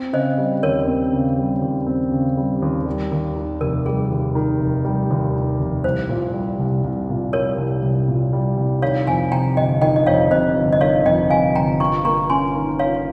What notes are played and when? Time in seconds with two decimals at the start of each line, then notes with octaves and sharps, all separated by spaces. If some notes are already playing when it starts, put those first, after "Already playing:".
Already playing: C4
0.13 C#3 C5 D#5
0.38 G3
0.63 D#2 A#4 C#5
0.88 C4
1.13 C#3
1.38 G3
1.62 D#2
1.87 C4
2.12 C#3
2.37 G3
2.62 D#2
2.86 G3
3.11 D#2
3.36 D#3
3.61 F1 A#4
3.86 G3 G#4
4.11 D#2
4.35 D#3
4.60 F1
4.85 G3
5.10 D#2
5.35 D#3
5.60 F1
5.84 C2 C5
6.09 A#2
6.34 G3
6.59 C2
6.84 C2
7.09 A#2
7.33 G3 A#4 C#5
7.58 C2
7.83 C2
8.08 A#2
8.33 G3
8.57 C2
8.82 D#3 C#5 F5
9.07 F2 F5 G#5
9.32 C3 G5 A#5
9.57 G1 D#5 G5
9.81 D#3 D#5 G5
9.96 D#5
10.06 F2 C#5 F5
10.31 C3 C5 D#5
10.57 G1
10.73 D#5
10.81 D#3 C#5 F5
11.05 F2 D#5 G5
11.30 C3 F5 G#5
11.55 G1 G5 A#5
11.80 F4 A#5 C#6
12.05 A#3 A#5 C#6
12.30 C#4 G#5 C6
12.55 D#3
12.79 F4 C#5 F5